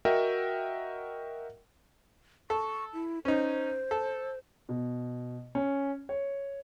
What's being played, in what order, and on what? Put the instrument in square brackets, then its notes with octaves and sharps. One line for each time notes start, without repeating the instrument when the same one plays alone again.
[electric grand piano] F#4 A#4 D#5 E5 F#5 G5
[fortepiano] A4 [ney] C#6
[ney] E4
[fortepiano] C#4 D#4 [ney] C5
[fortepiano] A4
[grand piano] B2
C#4
C#5